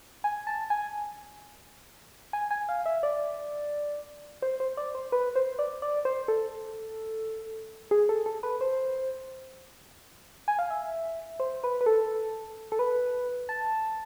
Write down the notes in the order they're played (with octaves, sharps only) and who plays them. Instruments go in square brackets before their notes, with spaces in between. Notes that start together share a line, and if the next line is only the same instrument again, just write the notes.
[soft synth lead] G#5
A5
G#5
G#5
G#5
F5
E5
D5
C5
C5
D5
C5
B4
C5
D5
D5
C5
A4
G#4
A4
A4
B4
C5
G#5
F5
E5
C5
B4
B4
A4
A4
B4
A5